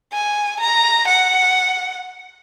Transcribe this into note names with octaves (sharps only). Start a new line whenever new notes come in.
G#5
A#5
F#5